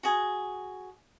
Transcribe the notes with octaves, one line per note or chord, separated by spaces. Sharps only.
F#4 G#4